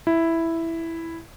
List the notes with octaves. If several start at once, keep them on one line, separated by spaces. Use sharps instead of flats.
E4